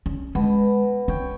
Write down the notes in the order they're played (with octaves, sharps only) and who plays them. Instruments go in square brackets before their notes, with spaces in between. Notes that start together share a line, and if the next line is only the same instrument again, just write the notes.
[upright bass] C#4
[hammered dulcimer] B2 [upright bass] G#3
[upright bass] C#4 [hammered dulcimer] C#5 G5